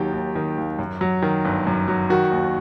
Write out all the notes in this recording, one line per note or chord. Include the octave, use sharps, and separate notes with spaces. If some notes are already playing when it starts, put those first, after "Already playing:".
Already playing: D#2 D#3 F#3 G4
D#2
D#3
D#2
F#2
F#3
D#3
G1
F#2
F#3
D#3 F#4
D#2